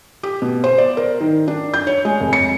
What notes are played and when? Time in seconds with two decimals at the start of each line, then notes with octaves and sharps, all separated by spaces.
0.23 G4
0.42 B2
0.64 C5
0.78 D5
0.97 A#4
1.20 D#3
1.48 D4
1.74 G6
1.87 C#5
2.05 G#3
2.20 F1
2.33 C#7